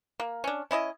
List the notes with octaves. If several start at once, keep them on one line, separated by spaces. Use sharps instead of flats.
A#3
C#4 D4
C#4 E4 D5 D#5